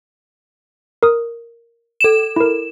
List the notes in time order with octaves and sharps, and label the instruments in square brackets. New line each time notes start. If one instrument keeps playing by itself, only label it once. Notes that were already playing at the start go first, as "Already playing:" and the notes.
[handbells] A#4 D#6
[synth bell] A4 E7
[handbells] E4 A#4